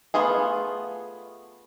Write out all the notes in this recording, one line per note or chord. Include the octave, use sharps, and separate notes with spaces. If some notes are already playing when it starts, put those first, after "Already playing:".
A3 B3 F4 G#4